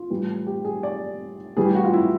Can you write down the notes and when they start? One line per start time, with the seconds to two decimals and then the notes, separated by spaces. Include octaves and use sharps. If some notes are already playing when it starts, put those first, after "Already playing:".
Already playing: F4
0.10 A2 E3 G3
0.47 G4
0.65 G#4
0.83 D5
1.57 A2 E3 G3 G#4
1.66 G4
1.75 F#4
1.84 F4
1.93 E4